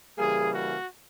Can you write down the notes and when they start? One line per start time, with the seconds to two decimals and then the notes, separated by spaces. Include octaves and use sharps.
0.17 C#3 E3 G3 A#3 G#4
0.54 F#4